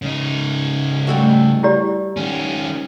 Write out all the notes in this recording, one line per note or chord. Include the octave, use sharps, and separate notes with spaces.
C#3 D#4
G3 A3 F#4
E4 G4 D5
D#3 C#4